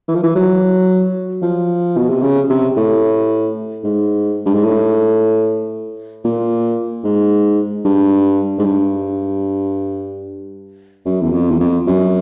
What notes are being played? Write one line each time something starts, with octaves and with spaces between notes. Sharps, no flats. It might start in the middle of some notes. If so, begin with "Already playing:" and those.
E3
F3
E3
F#3
F3
B2
C3
C#3
C3
A2
G#2
G2
G#2
A2
A#2
G#2
G2
G#2
G2
F#2
E2
F2
E2
F2
F#2